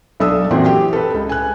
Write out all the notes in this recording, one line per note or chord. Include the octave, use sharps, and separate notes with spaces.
B1 D4 A4 D#6 E6
F#2 A#2 E3 F#3 C4
G4
A4 B4
C#2
G#5 F#6